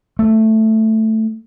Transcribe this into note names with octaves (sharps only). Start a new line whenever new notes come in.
A3